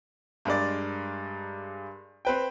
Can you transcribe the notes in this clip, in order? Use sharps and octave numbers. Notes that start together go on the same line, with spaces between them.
G2 G#3 A#4 D5
C4 B4 G5